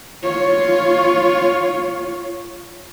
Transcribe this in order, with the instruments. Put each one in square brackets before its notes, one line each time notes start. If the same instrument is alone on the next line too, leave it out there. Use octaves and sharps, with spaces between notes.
[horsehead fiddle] F4 C#5